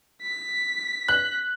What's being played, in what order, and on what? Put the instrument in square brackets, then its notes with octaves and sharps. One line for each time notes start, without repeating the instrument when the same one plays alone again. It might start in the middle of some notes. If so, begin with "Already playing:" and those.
[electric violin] B6
[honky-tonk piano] F#6